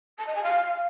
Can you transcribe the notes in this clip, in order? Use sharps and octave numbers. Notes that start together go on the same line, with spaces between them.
A5
D#5
G#5
F5